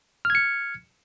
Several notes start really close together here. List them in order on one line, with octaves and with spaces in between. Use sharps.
F6 G#6 C#7